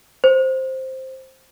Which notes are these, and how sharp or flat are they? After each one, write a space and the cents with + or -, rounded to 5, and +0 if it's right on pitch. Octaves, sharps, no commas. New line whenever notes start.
C5 +5